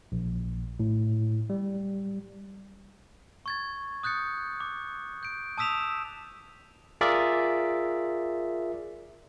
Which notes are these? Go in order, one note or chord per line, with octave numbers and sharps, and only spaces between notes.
A#1
A2
G3
C#6 G#6 A6
D#6 F#6 G6 A6 C#7
D6
G6 D7
A5 D#6 E6 B6 E7 F7
F4 G#4 A#4 D5 E5